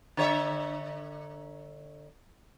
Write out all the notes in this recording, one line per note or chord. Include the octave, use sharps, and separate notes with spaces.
D3 C#5 E5